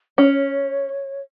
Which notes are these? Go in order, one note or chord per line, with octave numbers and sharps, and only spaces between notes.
C#4 C#5